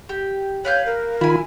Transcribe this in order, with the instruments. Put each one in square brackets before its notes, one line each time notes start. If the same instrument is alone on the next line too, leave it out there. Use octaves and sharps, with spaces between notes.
[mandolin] G4
[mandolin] B4 F5 G6 [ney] C#5
[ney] A#4
[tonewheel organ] D#3 F4 B5 [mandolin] E4 G#5